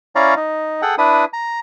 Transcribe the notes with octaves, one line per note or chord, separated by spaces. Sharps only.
C#4 E4 C#5 D5 F5 A#5
D#4
G#4 A4 F#5 G5
D4 E4 B4 D#6
A#5